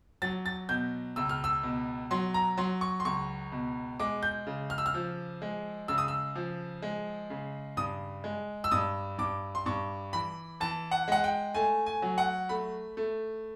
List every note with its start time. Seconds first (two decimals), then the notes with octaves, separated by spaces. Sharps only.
0.22 F#3 A6
0.46 A6
0.69 B2 G6
1.16 C#2 E6
1.29 F6
1.44 E6
1.63 B2
2.11 F#3 C6
2.34 A#5
2.57 F#3 C6
2.81 C#6
3.00 C6
3.05 C#2 C#6
3.52 B2
4.00 G#3 D6
4.23 G6
4.47 C#3
4.70 F6
4.78 E6
4.86 F6
4.94 F3
5.42 G#3
5.88 C#3 E6
5.98 D#6
6.08 E6
6.36 F3
6.82 G#3
7.30 C#3
7.77 G2 D#6
8.24 G#3
8.64 E6
8.71 G2 D#6
9.18 G2 D6
9.55 C6
9.66 G2 C#6
10.13 E3 B5
10.60 E3 A5
10.91 F#5
11.08 G#3 F#5
11.24 G5
11.54 A3 G#5
11.86 G#5
12.02 F#3
12.18 F#5
12.49 A3 B5
12.97 A3